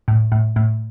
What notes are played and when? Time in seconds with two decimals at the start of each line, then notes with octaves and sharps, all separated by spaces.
0.08 A2
0.32 A2
0.56 A2